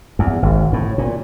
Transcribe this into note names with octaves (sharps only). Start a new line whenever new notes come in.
E2
G#1
A2
A#2